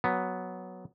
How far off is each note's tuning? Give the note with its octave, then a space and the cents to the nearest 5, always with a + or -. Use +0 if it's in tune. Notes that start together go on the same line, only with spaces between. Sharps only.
F#3 +0 B3 +0